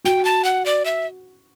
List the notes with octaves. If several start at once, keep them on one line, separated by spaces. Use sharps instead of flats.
F#4 G5
A5
F#5
D5
E5